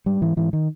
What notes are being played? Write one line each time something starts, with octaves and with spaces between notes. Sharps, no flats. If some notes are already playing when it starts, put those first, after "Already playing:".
G#2 G3
G#2 E3
G#2 E3
D#3